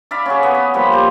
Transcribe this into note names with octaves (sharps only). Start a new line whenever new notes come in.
D5 E5 F5 B5
C#4 F#4 G#4
B3
B5
A#2 F3 G3
C5 D5